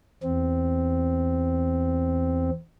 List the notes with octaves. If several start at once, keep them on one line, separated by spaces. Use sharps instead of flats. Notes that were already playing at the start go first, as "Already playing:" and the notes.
E2 C4